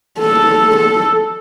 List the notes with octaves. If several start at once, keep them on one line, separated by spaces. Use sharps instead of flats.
A4
A4